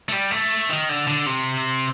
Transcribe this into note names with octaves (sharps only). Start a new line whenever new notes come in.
A3
G3
A3
D#3
D3
D3
C3